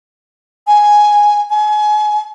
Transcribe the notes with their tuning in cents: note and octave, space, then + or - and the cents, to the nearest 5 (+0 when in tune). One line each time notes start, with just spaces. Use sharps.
G#5 +0
G#5 +30